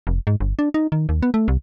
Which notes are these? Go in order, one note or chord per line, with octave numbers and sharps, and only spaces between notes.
F1
G#2
G1
D4
D#4
D#3
D#2
B3
A3
C2